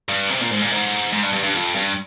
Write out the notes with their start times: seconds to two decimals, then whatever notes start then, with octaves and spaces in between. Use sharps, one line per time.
0.09 G2
0.30 C3
0.41 A#2
0.50 G#2
0.61 A#2
0.71 G#2
1.13 G#2
1.23 G2
1.33 G2
1.43 G2
1.54 F2
1.75 G2